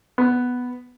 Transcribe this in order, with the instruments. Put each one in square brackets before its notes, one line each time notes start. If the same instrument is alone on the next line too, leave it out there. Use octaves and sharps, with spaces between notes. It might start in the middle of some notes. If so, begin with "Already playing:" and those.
[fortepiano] B3